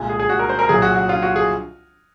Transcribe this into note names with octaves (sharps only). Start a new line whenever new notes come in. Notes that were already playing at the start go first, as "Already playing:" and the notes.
Already playing: C2 A#2 G#3 G#5
G#4
G#4
F#4
A#4
C5
A#4
C2 A#2 F#3 G#4
F#4
F#4
F4
F#4
G#4